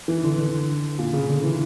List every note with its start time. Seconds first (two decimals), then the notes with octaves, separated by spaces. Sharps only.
0.08 E3
0.23 D3
0.38 D3
0.99 A#2
1.13 C#3
1.29 D3
1.44 E3